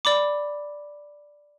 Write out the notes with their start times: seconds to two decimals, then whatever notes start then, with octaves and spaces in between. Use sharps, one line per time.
0.05 D5 B5 D6